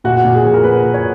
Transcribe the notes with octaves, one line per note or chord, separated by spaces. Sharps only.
A#2 F#4
A#2
G#4
F3
A#4
A#2 B4
A#2
C#5